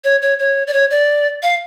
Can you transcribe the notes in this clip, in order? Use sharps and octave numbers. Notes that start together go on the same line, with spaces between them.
C#5
C#5
C#5
D5
C#5
D5
F5